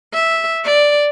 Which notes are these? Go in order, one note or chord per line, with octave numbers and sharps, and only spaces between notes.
E5
D5